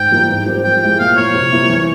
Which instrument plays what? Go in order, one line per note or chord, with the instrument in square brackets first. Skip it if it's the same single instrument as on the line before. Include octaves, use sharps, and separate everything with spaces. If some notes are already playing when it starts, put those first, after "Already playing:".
Already playing: [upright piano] G#2 [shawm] G5
[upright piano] E3 G3 A#3
G#2
G3 C4 G4 A#4
[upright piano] F3 [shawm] G5
[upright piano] G#3 E4 G4 [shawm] G5
[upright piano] A#2 [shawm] F5
[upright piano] F3 A#3 E4 [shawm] C#5
[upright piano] C3
G3 A#3 E4
E3